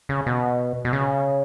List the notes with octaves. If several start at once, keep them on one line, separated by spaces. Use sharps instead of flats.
C#3
B2
B2
C#3